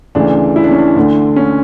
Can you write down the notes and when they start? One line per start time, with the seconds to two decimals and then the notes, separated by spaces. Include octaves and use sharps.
0.15 D2 C#3 E3 D4
0.56 E4
0.64 D4
0.71 C#4
0.78 D4
0.96 D2 D3
1.36 C#4